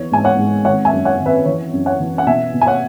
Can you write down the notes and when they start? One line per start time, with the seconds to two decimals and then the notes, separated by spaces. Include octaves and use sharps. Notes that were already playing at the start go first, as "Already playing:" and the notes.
Already playing: E2 E3 C#5
0.11 G#2 G#5
0.24 C#5 F#5
0.38 G#2
0.65 G#1 C#5 F#5
0.85 E5 G#5
0.92 F#2
1.05 C#5 F#5
1.19 G#1
1.26 B4 E5
1.45 E3 C#5
1.72 F#2
1.86 C#5 F#5
2.00 E3
2.18 F#5
2.27 B2 E5 G#5
2.54 B2
2.61 G#5
2.67 C#5 F#5